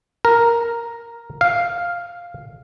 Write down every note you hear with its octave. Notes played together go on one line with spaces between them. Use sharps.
A#4
F5